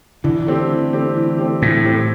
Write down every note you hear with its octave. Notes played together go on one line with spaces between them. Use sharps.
D3 E3
A3 C4 G4
E3
A3 C4 G4
E3
A3 C4 G4
A2 E3
A3 C4 G4